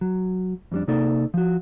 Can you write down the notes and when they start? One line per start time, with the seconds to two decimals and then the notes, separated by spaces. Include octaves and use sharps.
0.01 F#3
0.72 F2 G3 D4
0.88 C3 A#3 D#4 A4 D5
1.34 F3 F#4